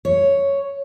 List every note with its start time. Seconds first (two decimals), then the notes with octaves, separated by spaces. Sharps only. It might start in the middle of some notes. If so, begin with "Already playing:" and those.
0.05 C#5